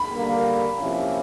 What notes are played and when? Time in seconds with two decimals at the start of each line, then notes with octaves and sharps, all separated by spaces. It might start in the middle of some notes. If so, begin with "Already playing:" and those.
Already playing: B5
0.15 D3 G3 A#3
0.79 C3 F3 A#3 C#4 E4